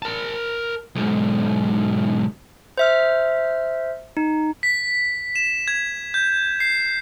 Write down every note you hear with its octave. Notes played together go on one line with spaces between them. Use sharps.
A#4 A5
B1 G#2
C5 E5 F6
D#4
B6
E7
G#6
G6
C7